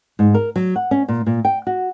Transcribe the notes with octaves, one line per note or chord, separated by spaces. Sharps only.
G#2
A#4
F#3
F#5
C#4
A#2
A#2
G5
F#4